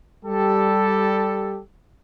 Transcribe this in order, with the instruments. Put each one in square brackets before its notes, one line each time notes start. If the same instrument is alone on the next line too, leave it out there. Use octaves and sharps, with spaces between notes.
[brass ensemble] G3 G4 A4